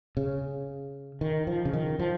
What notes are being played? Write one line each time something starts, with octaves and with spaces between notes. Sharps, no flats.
C#3
D#3
F3
C#3
D#3
F3